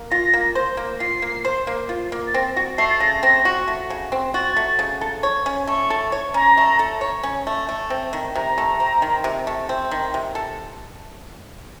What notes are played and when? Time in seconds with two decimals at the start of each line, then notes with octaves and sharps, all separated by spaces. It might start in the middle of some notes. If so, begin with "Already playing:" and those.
Already playing: A#3
0.11 F4 A#6
0.34 A#3
0.55 C5
0.77 A#3
1.00 F4 C7
1.22 A#3
1.45 C5
1.67 A#3
1.89 F4
2.12 A#3
2.27 A6
2.34 C4 A#6
2.56 F#4 A#6
2.78 A3 C7
2.90 A6
3.00 C#3 A#6
3.23 C4
3.45 F#4
3.68 A3
3.90 C#3
4.12 C4
4.34 F#4 A6
4.56 A3
4.79 C#3
5.01 A4
5.23 C#5
5.46 C#4
5.67 A3 C#6
5.90 A4
6.12 C#5
6.34 C#4 A#5
6.57 A3
6.79 A4
7.01 C#5
7.23 C#4
7.47 A3
7.69 A3
7.90 C4
8.13 D#3
8.35 C3 A#5
8.58 A3
8.80 C4
9.02 D#3
9.24 C3
9.47 A3
9.69 C4
9.91 D#3
10.14 C3
10.35 A4